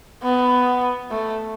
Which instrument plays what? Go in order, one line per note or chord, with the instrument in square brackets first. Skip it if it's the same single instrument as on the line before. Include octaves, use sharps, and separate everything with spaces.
[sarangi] B3
A3